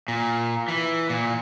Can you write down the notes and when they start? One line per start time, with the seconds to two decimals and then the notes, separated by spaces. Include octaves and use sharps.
0.08 A#2
0.68 E3
1.09 A#2